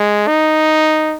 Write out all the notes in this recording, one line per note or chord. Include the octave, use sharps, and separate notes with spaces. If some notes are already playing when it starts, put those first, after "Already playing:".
Already playing: G#3
D#4